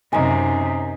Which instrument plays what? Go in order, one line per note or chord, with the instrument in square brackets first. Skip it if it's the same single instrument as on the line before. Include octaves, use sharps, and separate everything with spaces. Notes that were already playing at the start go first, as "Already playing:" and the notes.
[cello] F#2 C3 [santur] D#4 G#5